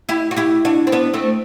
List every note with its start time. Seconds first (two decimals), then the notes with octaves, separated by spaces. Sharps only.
0.09 E4 G4
0.31 F#4
0.37 E4 G4
0.65 D4 F#4
0.87 C4
0.92 B3 D4
1.14 A3 C4